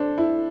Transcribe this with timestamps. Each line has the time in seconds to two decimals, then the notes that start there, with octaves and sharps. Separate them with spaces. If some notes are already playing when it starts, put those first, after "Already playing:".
Already playing: D4 A4 C5
0.18 E4